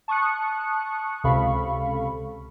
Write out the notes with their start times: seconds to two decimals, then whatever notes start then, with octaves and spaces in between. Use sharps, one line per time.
0.08 A5 C#6 D#6 F#6 C#7
1.24 C#2 C3 A4 F5 B5 C#6